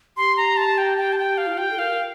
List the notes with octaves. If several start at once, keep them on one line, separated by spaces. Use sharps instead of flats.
G4 C6
A#5
A5
G5
G5
A5
G5
F5
E4
F4
G4 G5
A4
A#4 F5